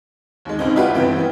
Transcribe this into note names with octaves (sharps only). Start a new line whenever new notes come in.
D#2 G#3
C#2 C4 D#4
E4 F4 G4 B4 F5 F#5
G2 C3 E3 B3 G5
E3 B3